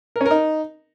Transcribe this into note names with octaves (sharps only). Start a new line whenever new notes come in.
A#4
C#4
A#4
D#4